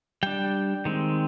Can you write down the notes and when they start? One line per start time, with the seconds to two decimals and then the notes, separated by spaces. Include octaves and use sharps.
0.23 G3 D4 G5
0.85 D#3 G#3 C4